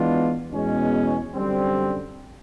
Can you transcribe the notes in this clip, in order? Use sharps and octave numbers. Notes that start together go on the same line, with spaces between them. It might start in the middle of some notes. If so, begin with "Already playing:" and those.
Already playing: E3 G#3 B3 D4 F4
E2 B2 G#3 C#4
F#2 D3 G3 C4